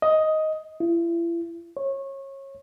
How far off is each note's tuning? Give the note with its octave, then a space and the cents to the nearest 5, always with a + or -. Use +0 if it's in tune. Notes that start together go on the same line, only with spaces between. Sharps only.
D#5 +10
E4 +40
C#5 -25